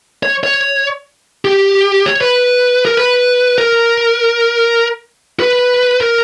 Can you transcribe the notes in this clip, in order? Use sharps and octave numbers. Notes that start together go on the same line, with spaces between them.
C#5
C#5
G4
C#5
B4
A#4
B4
A#4
B4
A#4